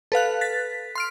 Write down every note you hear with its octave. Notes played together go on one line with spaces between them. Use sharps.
A4 B4 F5 F#6
A6 B6
C6 F6 D7